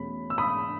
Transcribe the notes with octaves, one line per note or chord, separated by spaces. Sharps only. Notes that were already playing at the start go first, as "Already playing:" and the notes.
Already playing: E2 B2 A3 C#4 B5
E6
B5 D#6